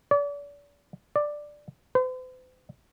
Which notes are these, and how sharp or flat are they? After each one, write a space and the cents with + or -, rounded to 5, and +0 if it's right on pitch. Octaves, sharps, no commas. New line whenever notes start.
D5 -40
D5 +5
C5 -45